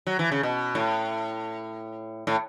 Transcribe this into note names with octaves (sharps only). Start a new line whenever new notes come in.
F#3
E3
C#3
B2
A2
A2